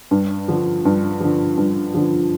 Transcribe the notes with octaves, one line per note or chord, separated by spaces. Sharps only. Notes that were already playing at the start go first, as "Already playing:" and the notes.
G2
D3 F3
G2
D3 F3
G2
D3 F3